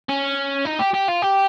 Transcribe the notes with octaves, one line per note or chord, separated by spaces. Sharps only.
C#4
D#4
G4
G4
F4
G4